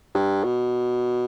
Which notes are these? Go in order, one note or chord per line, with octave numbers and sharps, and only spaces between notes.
G2
B2